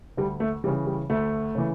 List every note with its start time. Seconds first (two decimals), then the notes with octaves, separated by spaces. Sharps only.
0.17 D2 G3
0.40 A3
0.64 E3 G3
0.67 C#3
0.86 G3
1.10 D2 A3
1.55 C#3 E3